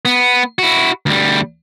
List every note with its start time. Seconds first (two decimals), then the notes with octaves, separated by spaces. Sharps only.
0.05 B3
0.59 E4 F#4
1.06 D2 G3